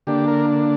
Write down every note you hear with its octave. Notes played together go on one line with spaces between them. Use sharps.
D3 A#3 D4 G4
A#4